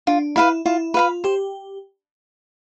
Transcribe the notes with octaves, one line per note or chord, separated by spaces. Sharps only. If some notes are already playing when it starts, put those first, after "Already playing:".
D4 F4
E4 B4 F5 B5
E4 F4
F4 B4 F5 B5
G4 C5